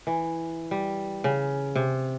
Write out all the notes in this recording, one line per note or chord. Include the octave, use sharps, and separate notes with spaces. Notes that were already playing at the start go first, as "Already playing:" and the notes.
E3
G3
C#3
C3